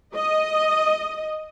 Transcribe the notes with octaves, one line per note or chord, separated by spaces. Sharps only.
D#5